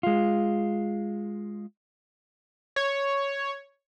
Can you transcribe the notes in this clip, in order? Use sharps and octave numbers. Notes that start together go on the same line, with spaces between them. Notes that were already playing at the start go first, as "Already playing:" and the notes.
G#3 F4
C#5